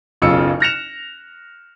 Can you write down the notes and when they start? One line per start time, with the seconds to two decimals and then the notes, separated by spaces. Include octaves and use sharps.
0.22 F#1 B1 C#3 F4 E6 C#7
0.60 F6 F#6 A#6 C#7 E7 F7